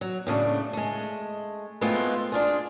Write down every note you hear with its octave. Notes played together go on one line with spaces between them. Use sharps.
F#3
A2 C#3 A3 D4
G#3 A3
G#3 A3 B3 C4 E4 F4
D4 F4 G#4